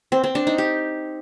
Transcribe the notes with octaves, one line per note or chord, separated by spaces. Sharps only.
C4
C4
D4
D#4
G4